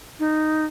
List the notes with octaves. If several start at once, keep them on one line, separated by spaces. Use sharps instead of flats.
D#4